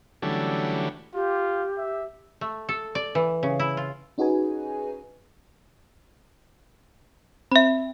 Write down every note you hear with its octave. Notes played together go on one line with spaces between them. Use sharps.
D3 E3 F#3 G3 A3 C#4
F4 G4
E5
A3
A4
D5
E3
C#3
E4
F4
C#4 D#4 F#4 G#4 B4 G#5
C4 E5 B5